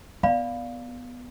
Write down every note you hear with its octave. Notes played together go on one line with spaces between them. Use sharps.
B3 D5 F5 B5